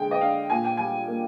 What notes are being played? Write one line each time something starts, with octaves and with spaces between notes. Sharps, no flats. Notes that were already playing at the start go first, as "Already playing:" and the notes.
Already playing: D3 G#3 G5
D#5
D4 F5
A#2 G#5
G5
G3 G#5
A#3